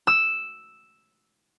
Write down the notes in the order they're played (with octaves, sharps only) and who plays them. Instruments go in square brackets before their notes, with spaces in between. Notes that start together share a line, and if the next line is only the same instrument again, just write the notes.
[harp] E6